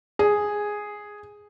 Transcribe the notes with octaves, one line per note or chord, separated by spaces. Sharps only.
G#4